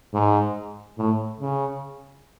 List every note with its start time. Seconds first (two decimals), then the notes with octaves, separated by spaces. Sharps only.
0.14 G#2
0.98 A2
1.40 C#3